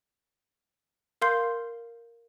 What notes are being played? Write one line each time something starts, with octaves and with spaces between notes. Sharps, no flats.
A#4 F5 C6 G6 C7